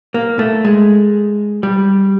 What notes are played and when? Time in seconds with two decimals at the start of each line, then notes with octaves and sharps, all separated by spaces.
0.14 A#3
0.39 A3
0.65 G#3
1.63 G3